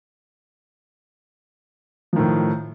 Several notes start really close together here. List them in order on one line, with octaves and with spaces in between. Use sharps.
F3 D#3 A2